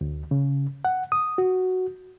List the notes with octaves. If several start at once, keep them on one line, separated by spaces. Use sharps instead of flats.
D2
C#3
F#5
D#6
F#4